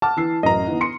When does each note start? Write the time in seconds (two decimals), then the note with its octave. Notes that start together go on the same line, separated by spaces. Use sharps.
0.02 F#5 A5 D6 F6
0.17 E3 E6 C7
0.43 A1 F#2 D#5 A#5
0.67 E3 B3 D#4
0.81 C6 C#7